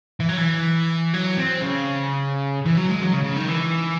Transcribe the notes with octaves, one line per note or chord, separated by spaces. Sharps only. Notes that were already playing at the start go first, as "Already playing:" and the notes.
E3
F#3
E3
F#3
C4
C#3
E3
F#3
G#3
F#3
C#3
C#3
D#3
E3